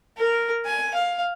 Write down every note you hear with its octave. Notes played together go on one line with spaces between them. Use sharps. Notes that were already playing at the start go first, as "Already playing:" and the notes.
A#4
G#5
F5